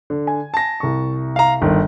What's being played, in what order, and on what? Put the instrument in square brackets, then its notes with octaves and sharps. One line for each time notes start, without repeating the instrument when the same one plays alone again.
[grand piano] D3
[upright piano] G#5
[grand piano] A5 A#6
[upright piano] C2 C#6
[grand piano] F5 A#5
[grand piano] G1 [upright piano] D#3